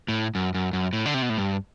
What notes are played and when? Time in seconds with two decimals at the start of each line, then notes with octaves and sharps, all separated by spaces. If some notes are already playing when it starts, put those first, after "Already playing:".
0.08 A2
0.35 F#2
0.54 F#2
0.73 F#2
0.93 A2
1.06 D3
1.14 C3
1.22 B2
1.30 A2
1.38 G2